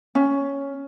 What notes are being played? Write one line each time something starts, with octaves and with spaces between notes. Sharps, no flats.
C#4